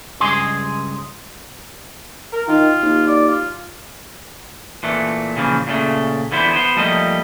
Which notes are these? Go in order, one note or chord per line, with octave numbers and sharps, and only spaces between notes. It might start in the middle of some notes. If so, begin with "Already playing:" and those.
C#2 G2 G#4 C6
A#4
D#3 F4
D#2
D5
F4
A#2 E3 A3
A#2 C#3 E3 F3
A#2 C#3 A3
D3 E3 B3 E4 C5
B3 C5
F3 G3 A3 A#3 D#5